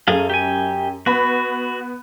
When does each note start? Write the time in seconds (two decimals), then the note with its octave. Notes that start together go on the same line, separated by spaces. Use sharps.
0.08 F#2 G#4 A4 F5
0.30 G4 G#5
1.06 B3 F#4 B5